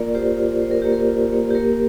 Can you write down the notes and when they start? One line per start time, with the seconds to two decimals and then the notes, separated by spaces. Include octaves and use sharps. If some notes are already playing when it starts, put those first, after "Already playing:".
Already playing: A#3 F4 A#4 D5
0.14 F4 G4 C5
0.38 F4
0.61 F4 C5
0.71 A#4
0.82 A#3 G4
0.92 A#4
1.09 F4
1.32 A#3
1.50 G4
1.55 A#3 A#4